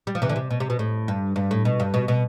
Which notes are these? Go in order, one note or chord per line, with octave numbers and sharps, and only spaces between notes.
G3
F3
C3 E3
D3
C3
B2
C3
B2
A2
G2
G2
A2
B2
G2
B2
B2